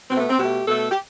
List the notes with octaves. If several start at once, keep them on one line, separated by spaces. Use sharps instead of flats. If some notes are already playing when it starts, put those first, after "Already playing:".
B2 A3 C4
B3
C4
B2 A3 G4
B2 A3 A4
G4